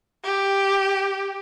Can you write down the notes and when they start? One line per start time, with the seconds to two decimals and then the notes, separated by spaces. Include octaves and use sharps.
0.25 G4